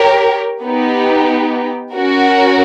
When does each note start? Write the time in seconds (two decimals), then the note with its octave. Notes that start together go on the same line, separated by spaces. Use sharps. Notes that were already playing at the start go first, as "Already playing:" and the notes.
Already playing: G4 A#4 C#5
0.63 B3 D#4 G4
1.93 C#4 F#4 A#4